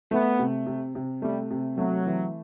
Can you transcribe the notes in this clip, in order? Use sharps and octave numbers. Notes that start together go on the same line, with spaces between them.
A3 B3
C3
C3
C3
G3 A3
C3
F#3 A3
E3